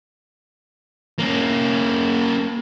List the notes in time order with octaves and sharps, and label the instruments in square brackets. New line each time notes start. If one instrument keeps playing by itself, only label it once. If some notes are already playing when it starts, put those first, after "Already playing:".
[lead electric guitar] A#3 C#4